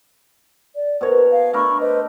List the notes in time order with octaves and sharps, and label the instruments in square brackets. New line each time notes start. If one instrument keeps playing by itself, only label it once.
[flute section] D5
[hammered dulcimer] B2 C#5 A#5 [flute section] A#4 C5
[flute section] F5
[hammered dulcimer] A3 D4 A#4 [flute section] B5 C#6
[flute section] B4 C5 D#5